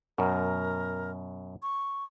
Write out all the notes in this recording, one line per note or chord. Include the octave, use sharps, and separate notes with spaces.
F#2 B2 A#4
C#6